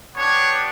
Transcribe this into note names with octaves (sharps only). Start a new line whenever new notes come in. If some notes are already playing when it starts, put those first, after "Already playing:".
B3 D4 G4 C#5